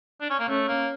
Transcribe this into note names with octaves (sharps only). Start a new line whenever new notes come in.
D4
C#4
A#3
A3 C#4
A#3